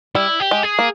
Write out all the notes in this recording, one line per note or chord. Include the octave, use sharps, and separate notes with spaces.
G3 E4
G4
G#3
G#4
A#3